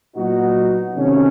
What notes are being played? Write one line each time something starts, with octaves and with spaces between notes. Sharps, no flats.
A#2 F#3 B3 D#4 F#4
C3 D#3 F#3 A3 C#4